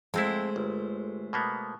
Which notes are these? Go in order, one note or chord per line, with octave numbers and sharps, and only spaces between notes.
F2 G#3 A3 C4 E4 C5
G1
B2 A#3 B3